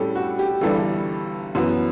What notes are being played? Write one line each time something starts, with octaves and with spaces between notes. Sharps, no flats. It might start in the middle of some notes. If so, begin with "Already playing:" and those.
Already playing: A2 G3 C#4 G4 A4
F#4
G4
G1 G2 E3 G3 D4 A4
F#2 E3 B3